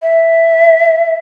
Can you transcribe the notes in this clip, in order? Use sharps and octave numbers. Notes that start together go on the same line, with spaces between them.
E5